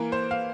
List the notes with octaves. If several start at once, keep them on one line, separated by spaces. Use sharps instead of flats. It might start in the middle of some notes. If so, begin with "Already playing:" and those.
Already playing: E3 A#3 A#4
C5
F5